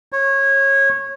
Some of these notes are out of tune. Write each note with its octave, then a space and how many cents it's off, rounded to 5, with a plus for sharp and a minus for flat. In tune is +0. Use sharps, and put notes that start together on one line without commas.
C#5 -20